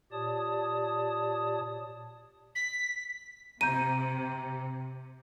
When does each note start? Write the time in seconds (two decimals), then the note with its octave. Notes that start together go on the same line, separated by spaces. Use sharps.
0.12 A#2 G4 C#5 D5 A5 D#6
2.55 B6
3.61 C3 A#5 G6 D#7